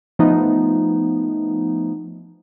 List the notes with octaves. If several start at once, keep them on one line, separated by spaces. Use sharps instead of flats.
F3 A3 B3 D#4